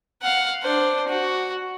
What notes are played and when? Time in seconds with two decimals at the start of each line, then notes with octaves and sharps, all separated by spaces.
0.22 F5 F#5
0.63 D4 C5
1.08 F#4